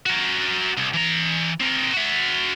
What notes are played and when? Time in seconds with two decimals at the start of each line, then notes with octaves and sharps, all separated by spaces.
0.06 F#4 A#4
0.77 C2
0.94 E3 A#5
1.61 C4 A#4
1.93 F#4 E5